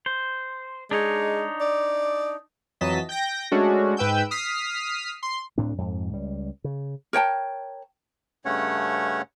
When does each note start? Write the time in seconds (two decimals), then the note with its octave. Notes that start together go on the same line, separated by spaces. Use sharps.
0.06 C5
0.91 G#3 D4 D#4 C#5
1.60 D5
2.81 F2 E3 F#3 D#5 A5 B6
3.09 G5 G6 A#6
3.52 G#3 A3 C#4 D4 F#4
3.97 G#2 B4 G5 E6 G6
4.31 D#6 F6 B6 C7
5.23 C6
5.58 D2 A2 C4 D4
5.78 F2 G#2
6.13 C#2 G3
6.64 C#3
7.13 A#4 C#5 G5 A5
8.45 G2 C#3 A3 C#4 C#5 F#5